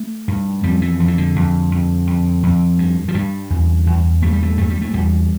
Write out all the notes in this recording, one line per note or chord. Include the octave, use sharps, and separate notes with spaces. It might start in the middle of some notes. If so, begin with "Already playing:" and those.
Already playing: A3
G2
F2 G3
E3
F2
E3
D3
F2
F2
F2
F2
G2
F3
G2 G3
E2
E2
G2 A3
G3
A3
G2 A3
G3
A3
E2 G3